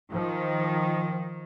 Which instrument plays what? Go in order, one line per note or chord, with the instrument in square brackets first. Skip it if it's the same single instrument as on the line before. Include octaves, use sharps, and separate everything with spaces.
[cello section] D#3 [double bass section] F3